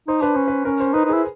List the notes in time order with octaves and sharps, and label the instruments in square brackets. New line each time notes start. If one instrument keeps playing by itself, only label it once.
[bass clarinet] D#4 [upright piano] C5
[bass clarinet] D4 [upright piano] B4
[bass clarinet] C#4 [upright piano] C5
[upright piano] B4
[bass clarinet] C#4 [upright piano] A#4
[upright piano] C5
[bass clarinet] D#4 [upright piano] B4
[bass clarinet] D#4
[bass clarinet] E4 [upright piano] G#4